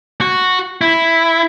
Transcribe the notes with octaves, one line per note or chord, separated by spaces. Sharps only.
F#4
E4